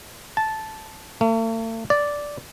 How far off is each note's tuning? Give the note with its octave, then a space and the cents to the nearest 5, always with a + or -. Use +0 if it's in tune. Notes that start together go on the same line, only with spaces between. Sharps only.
A5 -10
A3 +45
D5 -5